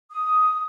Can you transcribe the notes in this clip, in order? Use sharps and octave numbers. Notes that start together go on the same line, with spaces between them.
D#6